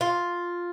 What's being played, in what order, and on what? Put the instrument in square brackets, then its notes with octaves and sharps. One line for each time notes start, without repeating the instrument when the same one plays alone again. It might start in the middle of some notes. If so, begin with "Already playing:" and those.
[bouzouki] F4